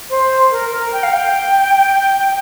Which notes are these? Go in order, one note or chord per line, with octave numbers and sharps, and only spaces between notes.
C5
A#4
A#4
G5
F5
G5